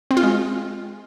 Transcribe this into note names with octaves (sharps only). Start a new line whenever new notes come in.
C4
F4
G#3